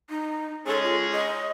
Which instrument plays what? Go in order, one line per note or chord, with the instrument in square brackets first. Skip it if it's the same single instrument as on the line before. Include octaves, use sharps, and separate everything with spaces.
[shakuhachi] D#4
[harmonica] G#3 C#4 G#4 [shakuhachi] A4
[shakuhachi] F4
D#5